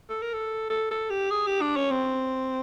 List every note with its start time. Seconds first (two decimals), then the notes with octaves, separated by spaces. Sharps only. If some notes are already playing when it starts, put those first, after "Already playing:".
0.10 A4
0.22 A#4
0.34 A4
0.70 A4
0.91 A4
1.10 G4
1.30 G#4
1.47 G4
1.62 D4
1.76 C#4
1.91 C4